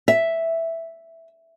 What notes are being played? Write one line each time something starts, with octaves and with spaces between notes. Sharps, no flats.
E5